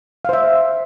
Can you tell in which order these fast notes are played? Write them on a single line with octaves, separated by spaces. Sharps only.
F5 C5 E5